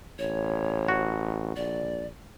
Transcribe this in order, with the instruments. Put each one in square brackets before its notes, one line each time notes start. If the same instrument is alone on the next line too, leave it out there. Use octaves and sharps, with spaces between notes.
[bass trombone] A1 [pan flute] C#5
[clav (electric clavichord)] F#4
[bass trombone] A#1 [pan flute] D5